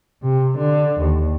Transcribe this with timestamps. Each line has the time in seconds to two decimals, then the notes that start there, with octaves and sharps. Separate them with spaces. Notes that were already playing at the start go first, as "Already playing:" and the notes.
0.23 C3
0.58 D3
1.00 D#2